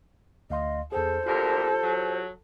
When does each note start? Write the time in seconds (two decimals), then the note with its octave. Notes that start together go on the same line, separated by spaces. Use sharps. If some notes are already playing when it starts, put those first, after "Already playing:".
0.50 D2 D#5 F5 C6
0.92 E2 G#4 A4 C5
1.26 D2 A#2 F4 G4 A4 A#4
1.82 F#3